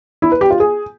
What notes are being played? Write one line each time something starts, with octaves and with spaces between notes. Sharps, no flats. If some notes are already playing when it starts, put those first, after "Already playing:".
E4
B4
G4
F4
G#4